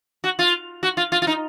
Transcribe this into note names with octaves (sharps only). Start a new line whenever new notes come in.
F#4
F4
F#4
F4
F4
F4
D#4